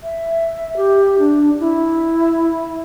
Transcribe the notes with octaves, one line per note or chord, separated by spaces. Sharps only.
E5
G4
D4
E4